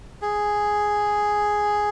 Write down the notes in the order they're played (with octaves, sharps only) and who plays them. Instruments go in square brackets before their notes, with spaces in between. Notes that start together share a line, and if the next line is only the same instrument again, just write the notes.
[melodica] G#4